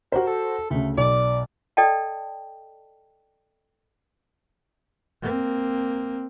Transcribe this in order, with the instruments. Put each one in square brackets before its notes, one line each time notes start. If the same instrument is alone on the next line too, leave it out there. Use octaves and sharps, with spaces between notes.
[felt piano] F#4 C5 [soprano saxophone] A#4
[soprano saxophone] A4
[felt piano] D2 C#3 [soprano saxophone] A3
[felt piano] B1 [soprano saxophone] D5
[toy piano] A4 D5 D#5 G5 A5
[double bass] A#3 C4